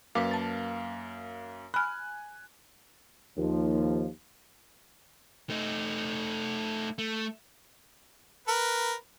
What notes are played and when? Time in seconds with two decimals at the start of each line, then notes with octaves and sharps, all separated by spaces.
0.15 F#2 A#3 B4 F5 D6
0.31 A5 A6
1.74 G#5 B5 F6 F#6
3.37 D#2 F3
5.50 A3 D#4
6.98 A3
8.48 A#4 B4